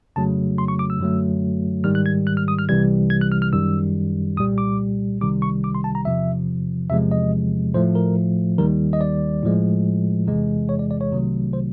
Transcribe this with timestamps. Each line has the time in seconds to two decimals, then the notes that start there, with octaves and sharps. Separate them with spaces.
0.16 F2 C#3 F#3 A3 A5
0.58 C6
0.68 C#6
0.79 D6
0.90 E6
0.99 F#2 D3 F#3 A3
1.84 G#2 D#3 G3 F6
1.95 F#6
2.06 G#6
2.27 F#6
2.37 F6
2.48 D#6
2.59 F6
2.69 C2 C3 E3 G3 G#6
3.10 G#6
3.21 F#6
3.32 F6
3.42 F6
3.53 F#2 D#3 G3 E6
4.37 C2 A#2 G3 D#6
4.58 D6
5.21 C2 C3 D#3 G3 D6
5.42 C#6
5.64 D6
5.75 C6
5.84 A5
5.95 A#5
6.05 E2 C3 F3 E5
6.90 E2 C3 F3 G#3 E5
7.12 D#5
7.74 A2 F3 A3 C5
7.95 A#4
8.58 D#2 D#3 G3 A#4
8.93 D#5
9.01 D5
9.43 A2 F3 G#3
10.27 E2 C3 E3 G#3
10.69 C#5
10.79 D5
10.91 D5
11.01 C#5
11.11 C2 C3 D#3 F#3 A3
11.53 C5